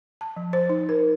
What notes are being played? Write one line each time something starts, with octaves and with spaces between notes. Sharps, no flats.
A5
F3
C5
D#4
A#4